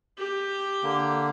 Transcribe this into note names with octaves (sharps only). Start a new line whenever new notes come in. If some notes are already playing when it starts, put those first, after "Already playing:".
G4
D3 A#3